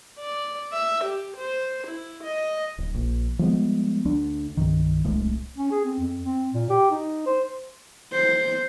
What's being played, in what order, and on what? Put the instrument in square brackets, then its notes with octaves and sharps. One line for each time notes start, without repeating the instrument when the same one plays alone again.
[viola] D5
E5
G4
C5
E4
D#5
[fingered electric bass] D1
A#1
F3 G3 G#3 B3
D2 D4
C2 G2 D#3
D1 C2 G#3 A3
[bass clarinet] C#4
G#4
C4
F2
C4
A#2
G4
D#4
C5
[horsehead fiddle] C5